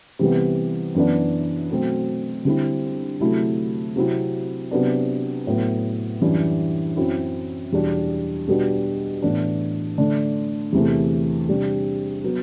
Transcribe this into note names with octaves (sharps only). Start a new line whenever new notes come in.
C3 E3 G3 B3
F#2 E3 B3 D4
B2 F#3 A3 C4
D3 G3 C4 E4
C3 F#3 A3 E4
C3 F#3 C4 E4
C3 F#3 B3 D4
A2 F#3 B3
F#2 E3 G3 D4
F#2 F#3 C4 E4
E2 B2 G3 D4
B2 G3 B3 D4
A2 E3 B3 D4
D3 A3 D4
E2 C3 E3 A3
C3 G3 D4
F#3 B3